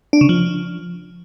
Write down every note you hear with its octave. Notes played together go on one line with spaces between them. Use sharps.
D4
C#3
F3